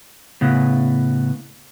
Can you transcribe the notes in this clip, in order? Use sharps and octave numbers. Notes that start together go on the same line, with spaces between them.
A2 C#3 B3